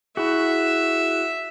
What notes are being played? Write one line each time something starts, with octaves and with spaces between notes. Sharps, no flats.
E4 F#4 G#4 E5